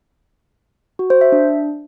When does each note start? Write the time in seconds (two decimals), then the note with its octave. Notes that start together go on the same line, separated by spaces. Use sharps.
0.99 F#4
1.10 C5
1.21 E5
1.32 D4